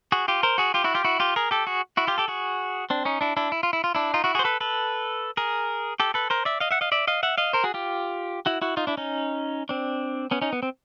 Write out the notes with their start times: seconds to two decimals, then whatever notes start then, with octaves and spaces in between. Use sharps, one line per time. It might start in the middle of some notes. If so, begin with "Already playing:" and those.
0.12 F#4 G#4
0.28 F4 G4
0.43 A#4 C5
0.58 F#4 G#4
0.74 F4 G4
0.84 E4 F#4
0.94 F4 G4
1.04 E4 F#4
1.20 F4 G4
1.36 G#4 A#4
1.51 G4 A4
1.67 F#4 G#4
1.97 E4 F#4
2.07 F4 G4
2.18 G4 A4
2.28 F#4 G#4
2.90 C4 D4
3.05 C#4 D#4
3.21 D4 E4
3.37 D4 E4
3.52 E4
3.63 F4
3.73 E4
3.84 F4
3.95 D4 E4
4.14 D#4 F4
4.24 E4 F#4
4.35 F#4 G#4
4.39 C5
4.44 A4 B4
4.61 A4 B4
5.37 G#4 A#4
6.00 G4 A4
6.14 A4 B4
6.30 A#4 C5
6.45 D5 E5
6.60 D#5 F5
6.71 E5 F#5
6.81 D#5 F5
6.92 D5 E5
7.07 D#5 F5
7.23 E5 F#5
7.38 D#5 F5
7.53 A#4 C5
7.64 F#4 G#4
7.74 F4 G4
8.46 E4 F#4
8.62 E4 F#4
8.77 D#4 F4
8.87 D4 E4
8.97 C#4 D#4
9.69 C4 D4
10.31 B3 C#4
10.41 C#4 D#4
10.53 B3
10.63 C4